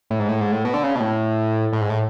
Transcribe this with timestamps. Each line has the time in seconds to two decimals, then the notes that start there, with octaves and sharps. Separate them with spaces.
0.11 A2
0.19 G#2
0.29 A2
0.41 G#2
0.52 A2
0.65 B2
0.74 D3
0.83 C#3
0.95 B2
1.00 A2
1.73 A2
1.81 G#2
1.90 A2